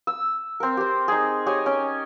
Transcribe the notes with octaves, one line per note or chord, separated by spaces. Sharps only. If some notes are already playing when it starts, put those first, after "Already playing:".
E6
C4 A#4
G4 C5
D#4 G#4
G4 C#5 D#5 G#5
C#4 G5